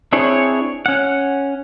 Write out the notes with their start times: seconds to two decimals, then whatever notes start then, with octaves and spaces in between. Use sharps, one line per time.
0.12 C4 D4 E4 G#4 C#5
0.86 C#4 F#5